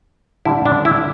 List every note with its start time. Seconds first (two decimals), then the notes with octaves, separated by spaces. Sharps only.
0.45 D3 G3 D4 E4
0.66 D4
0.85 E4